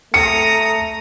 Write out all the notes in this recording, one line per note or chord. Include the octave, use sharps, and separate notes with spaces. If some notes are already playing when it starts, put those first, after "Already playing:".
A3 A#5 D#6 C#7